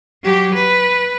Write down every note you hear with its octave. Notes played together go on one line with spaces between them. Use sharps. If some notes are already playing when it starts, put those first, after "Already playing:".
F#3 G4
B4